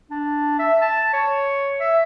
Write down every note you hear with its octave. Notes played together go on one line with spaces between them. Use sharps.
D4
E5
A5
C#5
E5